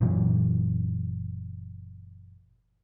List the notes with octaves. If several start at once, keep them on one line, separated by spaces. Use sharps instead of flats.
F#1 A#2 E3 F#3